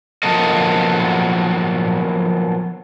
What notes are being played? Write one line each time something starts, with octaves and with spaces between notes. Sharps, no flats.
F3 F#3 A#3 B3 A4 D#5